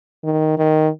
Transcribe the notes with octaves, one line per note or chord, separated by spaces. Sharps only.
D#3
D#3